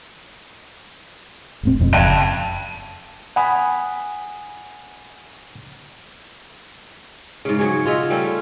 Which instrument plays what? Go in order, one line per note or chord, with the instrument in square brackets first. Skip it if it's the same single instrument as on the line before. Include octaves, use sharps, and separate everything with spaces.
[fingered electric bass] E1 A2 C4
E1 F2
[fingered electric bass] F#1 [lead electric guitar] G5 A5
[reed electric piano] F#5 G#5 B5 D#6
[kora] G#2 C#3
F#3 G#4 C#5
F4 G#4 D#5 E5
G3 A3 C4 C#4